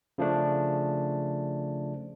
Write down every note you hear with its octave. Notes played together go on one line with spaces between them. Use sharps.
C#3 F3 A3 D4